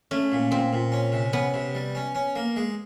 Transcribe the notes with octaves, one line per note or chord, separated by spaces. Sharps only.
A3 C#4
A#2
A#2 C4
A#2
C#4
C3
B3 C#4
C3
G3
C#4
C#4
A#3
G#3